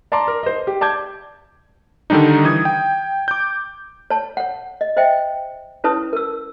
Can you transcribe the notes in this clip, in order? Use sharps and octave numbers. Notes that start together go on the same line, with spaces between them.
D5 A5 A#5 C6 D6
A#4
C5 D#5
G4
D5 A5 D6 G6 G#6
D3 D#3 G3 D4 D#4
E3 D#6 G#6
G5
D6 G6
C#5 A5
C#5 F#5
D#5
C5 D#5 E5 G5
C#4 E4 B4 C#5 A5 D#6
A#4 E6